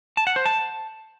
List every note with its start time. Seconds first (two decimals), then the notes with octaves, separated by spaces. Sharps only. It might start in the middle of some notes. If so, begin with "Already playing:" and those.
0.17 A5
0.27 F#5
0.36 C5
0.45 A5